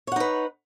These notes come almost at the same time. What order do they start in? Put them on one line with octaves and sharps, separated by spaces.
C#5 F#5 D#4 B4